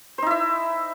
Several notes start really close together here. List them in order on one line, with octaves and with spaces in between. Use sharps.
C5 D#4 E4 E5